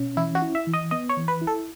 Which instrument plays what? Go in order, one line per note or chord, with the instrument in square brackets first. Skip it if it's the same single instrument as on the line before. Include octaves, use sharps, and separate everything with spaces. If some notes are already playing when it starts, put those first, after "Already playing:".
Already playing: [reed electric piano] B2 C#4
[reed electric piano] E3 [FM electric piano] E4
[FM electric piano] F#4
[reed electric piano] E4
[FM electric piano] E5
[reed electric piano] E3
[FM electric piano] D#5
[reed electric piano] B3 [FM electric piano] D#5
[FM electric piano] C#5
[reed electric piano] E3
[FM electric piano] B4
[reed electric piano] E4
[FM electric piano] A4